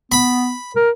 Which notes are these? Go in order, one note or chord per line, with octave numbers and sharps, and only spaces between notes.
B3 B5
A#4